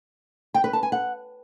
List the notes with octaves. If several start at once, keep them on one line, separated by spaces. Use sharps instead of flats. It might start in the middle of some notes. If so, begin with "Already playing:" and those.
G5
B4
A5
G#5
F#5